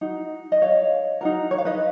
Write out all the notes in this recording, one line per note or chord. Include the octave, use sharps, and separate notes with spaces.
D#4 F#4
D#5
C#5 F5
D#4 F#4 A#4
C#5
F5
B4 D#5